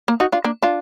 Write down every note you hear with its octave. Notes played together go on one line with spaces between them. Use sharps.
A#3
D#4 F#4
D4 F4
A#3 D4
D4 F4